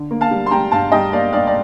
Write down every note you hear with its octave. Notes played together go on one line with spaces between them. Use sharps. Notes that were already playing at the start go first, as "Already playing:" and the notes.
Already playing: D3
A#3
F5 A5
G3
C6
G3 G5 A#5
G2 F5 A5
G3 D#5 G5
A#3 D5 F5
G2 D5 F5
D5